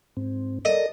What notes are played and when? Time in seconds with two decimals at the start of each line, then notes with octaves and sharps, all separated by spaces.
0.17 G#2 C4
0.65 A4 A#4 D5 D#5